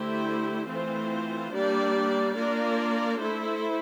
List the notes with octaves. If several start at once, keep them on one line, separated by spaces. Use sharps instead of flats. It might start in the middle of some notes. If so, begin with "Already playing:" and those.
Already playing: D3 A3 E4 G4 C5
E3 A3 C4 F4 C5
G3 A#3 D4 G4 D5
A#3 D4 F4 A#4 D5
A3 E4 A4 C5